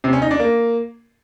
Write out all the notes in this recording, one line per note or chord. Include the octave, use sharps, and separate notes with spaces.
C3
C#4
D#4
D4
A#3